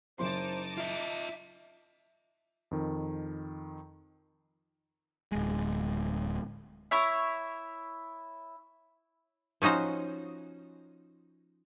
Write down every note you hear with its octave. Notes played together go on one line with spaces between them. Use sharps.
F#1 D#4 C5 A5 C6 D6
F4 D#5 E5
F2 D#3
D1 G#3
E4 C#5 E5
F3 C#4 D#4 F#4 C5